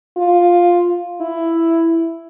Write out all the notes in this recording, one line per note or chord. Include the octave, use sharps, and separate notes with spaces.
F4
E4